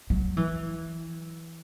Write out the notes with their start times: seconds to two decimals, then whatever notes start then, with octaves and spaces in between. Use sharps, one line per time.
0.10 F#3
0.37 E3